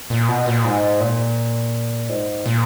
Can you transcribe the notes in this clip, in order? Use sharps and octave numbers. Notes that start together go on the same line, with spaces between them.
A#2
B2
A#2
G#2
A#2
G#2
A#2